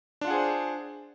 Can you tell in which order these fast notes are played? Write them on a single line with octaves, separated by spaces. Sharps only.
D4 F4 F#5 G#4 C5